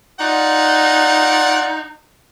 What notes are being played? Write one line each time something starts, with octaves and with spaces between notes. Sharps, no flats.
D#4 F4 D5 F#5